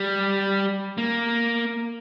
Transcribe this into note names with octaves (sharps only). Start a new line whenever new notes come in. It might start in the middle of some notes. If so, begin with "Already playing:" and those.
Already playing: G3
A#3